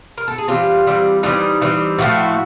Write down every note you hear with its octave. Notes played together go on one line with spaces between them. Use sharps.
A#4
A4
G#4
E3 G3 C4 F4 G4
E3 G3 C4
E3 G3 C4 D#4 F4
E3 G3 C4
A2 F3 A3 E4 F#4